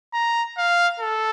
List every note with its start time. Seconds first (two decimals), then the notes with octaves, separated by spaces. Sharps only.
0.14 A#5
0.57 F5
1.00 A4